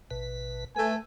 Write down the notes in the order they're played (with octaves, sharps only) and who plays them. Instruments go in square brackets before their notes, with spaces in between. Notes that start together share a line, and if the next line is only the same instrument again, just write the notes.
[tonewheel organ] A1 B2 B4
[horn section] A3 G#5 [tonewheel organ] B4